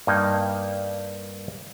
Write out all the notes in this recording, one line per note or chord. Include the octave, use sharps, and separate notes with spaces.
G2 A#3 D#4